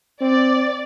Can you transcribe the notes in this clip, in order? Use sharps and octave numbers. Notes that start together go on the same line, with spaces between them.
C4 D5